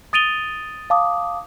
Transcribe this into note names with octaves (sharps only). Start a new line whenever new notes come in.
D#6 A6 D7 D#7 F7 G7
F5 A5 D6 D#6